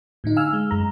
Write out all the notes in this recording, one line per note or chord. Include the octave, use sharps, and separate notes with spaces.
A2 D3 D#4
F5 G#5 E6 F6
G#3
F#2 G#3 A#5